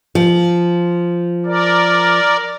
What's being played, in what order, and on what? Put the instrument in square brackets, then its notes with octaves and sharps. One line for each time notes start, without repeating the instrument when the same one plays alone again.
[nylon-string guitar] F3
[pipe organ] A#4 D5